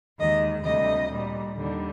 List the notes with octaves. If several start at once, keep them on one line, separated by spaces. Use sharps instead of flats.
D#2 D#3 G#3 D#5
D2 C3 G3 D#5
A#2 G3
D#2 D3 G3